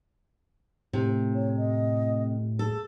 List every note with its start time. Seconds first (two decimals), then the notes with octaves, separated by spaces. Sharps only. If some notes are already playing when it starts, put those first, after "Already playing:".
0.93 A2 C3
1.34 C#5
1.57 D#5
2.59 G#4 A4